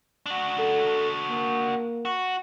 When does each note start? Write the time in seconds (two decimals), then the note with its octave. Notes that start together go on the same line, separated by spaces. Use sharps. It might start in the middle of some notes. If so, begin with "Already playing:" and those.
0.26 D4 F#4
0.59 A4
1.30 A#3
2.05 F#4